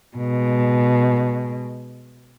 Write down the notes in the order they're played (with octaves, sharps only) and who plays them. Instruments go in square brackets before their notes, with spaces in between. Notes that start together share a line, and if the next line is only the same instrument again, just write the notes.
[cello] B2 G#3